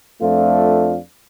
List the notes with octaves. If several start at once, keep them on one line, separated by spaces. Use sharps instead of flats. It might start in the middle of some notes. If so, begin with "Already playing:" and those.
F2 A3 D4 F4